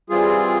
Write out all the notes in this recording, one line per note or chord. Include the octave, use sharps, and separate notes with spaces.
E3 G3 C4 F4 G#4